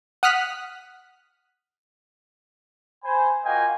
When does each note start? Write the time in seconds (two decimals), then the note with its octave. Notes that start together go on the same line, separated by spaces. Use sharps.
0.23 F#5 D#6 F6 F#6 B6
3.04 C5 G#5 B5
3.45 A#3 F4 F#4 D#5 G5 G#5